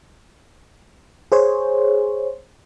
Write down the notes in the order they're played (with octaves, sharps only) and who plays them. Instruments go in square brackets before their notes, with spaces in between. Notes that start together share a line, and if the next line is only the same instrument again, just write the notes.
[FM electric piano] G#4 C5 C#5